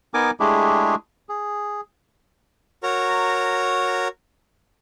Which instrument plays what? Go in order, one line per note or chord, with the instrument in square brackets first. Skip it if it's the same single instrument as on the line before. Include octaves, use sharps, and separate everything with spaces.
[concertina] B3 D#4 A#4 G#5 D6
G#3 A3 D4 E4 G4 G#4
G#4
[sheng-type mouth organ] F#4 A#4 C#5 A#5